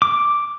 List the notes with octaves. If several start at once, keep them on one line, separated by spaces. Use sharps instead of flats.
D6